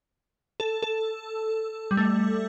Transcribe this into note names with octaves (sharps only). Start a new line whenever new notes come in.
A4
A4
G3
A3